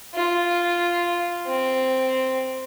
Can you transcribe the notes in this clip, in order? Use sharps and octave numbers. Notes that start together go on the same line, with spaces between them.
F4
C4